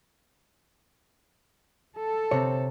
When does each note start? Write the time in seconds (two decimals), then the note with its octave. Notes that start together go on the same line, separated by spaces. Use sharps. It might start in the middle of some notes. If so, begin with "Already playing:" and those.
1.97 A4
2.31 C3 C4 C#5